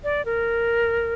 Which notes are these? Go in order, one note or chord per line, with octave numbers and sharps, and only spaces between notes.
D5
A#4